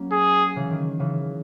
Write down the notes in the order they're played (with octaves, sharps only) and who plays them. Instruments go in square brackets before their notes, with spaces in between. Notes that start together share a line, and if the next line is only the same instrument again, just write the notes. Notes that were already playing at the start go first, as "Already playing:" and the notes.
Already playing: [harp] F#3 A#3 C#4
[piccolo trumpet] G#4
[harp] C#3 E3
D#3
C#3 E3